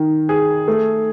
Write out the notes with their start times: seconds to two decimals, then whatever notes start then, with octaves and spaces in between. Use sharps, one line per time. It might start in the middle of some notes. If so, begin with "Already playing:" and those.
Already playing: D#3
0.29 G#4
0.68 A3